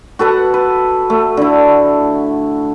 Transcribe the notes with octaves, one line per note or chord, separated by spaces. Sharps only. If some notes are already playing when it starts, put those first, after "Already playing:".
F#4 A4 B4 F#5
B4
A3
D3 E4